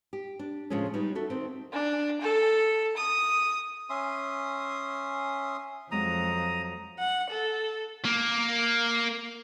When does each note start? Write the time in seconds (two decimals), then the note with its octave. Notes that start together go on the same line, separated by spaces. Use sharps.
0.13 G4
0.39 D4
0.70 A2 C#3 F3 G#3 A3 C#4
0.94 G3 B3 D#4
1.15 F#4 A4 E5
1.30 D#3 C4
1.72 D4
2.21 A4
2.97 D#6
3.90 C#4 E5 C6 D#6
5.92 F2 F#3 G#3 C4 A#5 D#6
6.98 F#5
7.29 A4
8.05 A#3